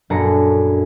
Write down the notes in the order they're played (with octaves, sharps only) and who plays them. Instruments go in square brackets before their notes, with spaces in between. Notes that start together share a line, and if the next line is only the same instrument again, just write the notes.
[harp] A#1 F#2 D4 A4 A#5 C#7